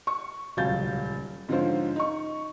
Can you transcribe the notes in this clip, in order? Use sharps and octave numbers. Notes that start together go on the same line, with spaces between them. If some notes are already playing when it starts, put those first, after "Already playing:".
C#6
D#1 C#2 F#3 F5 G6 A6
G#2 D3 F3 C#4 F4 C5
D#4 C#6